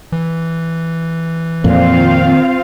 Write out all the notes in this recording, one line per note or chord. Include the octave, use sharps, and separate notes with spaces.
E3
F2 A#2 C4 F4 F5
D#3